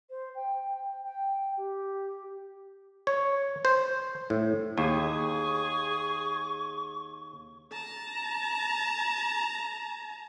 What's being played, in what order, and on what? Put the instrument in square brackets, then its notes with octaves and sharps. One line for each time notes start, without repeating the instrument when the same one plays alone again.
[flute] C5
G5
G5
G4
[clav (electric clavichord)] C#5
C5
A2
[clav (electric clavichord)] D#2 [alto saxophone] G#4 [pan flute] C#6
[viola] A5 A#5